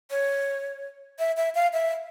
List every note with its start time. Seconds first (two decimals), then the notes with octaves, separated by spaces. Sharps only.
0.11 C#5
1.19 E5
1.37 E5
1.55 F5
1.73 E5